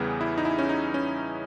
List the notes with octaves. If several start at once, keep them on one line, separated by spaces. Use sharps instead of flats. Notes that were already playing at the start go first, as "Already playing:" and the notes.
Already playing: E2 C#3 E3 G3 B3 G#4
E4
D#4
E4
C#4
D#4
C#4